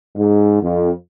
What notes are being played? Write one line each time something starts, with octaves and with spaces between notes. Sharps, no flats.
G#2
F2